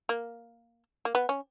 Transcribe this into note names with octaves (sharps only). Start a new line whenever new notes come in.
A#3
A#3
B3
C#4